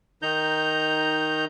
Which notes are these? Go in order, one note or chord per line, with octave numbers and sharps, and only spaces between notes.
D#3 D#4 A#5 G6